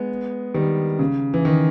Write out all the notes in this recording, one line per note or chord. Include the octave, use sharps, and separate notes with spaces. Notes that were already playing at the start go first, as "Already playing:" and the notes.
Already playing: G#3 B3
D#3 G3
C#3
E3
D#3